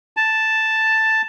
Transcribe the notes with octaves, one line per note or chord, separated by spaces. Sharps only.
A5